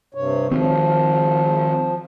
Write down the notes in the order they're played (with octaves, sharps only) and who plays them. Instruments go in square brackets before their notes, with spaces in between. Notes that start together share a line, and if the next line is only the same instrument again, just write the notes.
[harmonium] G2 C3 C#5
[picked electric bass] D#3 C4 [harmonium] F3